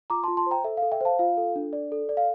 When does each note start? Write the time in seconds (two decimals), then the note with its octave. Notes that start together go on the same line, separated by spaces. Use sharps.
0.10 F4 A#5 D6
0.23 A5 C6
0.28 F4
0.37 A5 C6
0.46 C5 G5 A#5
0.64 A4 E5
0.77 F5
0.82 A4
0.92 E5 G5
1.01 C5 F5 A5
1.19 F4 F5
1.37 A4
1.56 D4
1.73 D5
1.92 A4
2.09 D5
2.17 F5